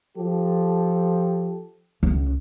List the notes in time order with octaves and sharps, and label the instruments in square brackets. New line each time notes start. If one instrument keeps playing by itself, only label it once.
[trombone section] F3 G4 A4
[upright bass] C#2